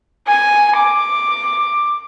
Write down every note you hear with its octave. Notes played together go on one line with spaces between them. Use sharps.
G#5
D6